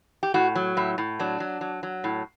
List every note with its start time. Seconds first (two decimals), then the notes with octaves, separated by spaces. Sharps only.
0.23 G4
0.34 A2 F#4
0.55 F#3
0.77 A2 E4
0.98 A2
1.19 F#3 D4
1.40 F#3
1.61 F#3
1.83 F#3
2.04 A2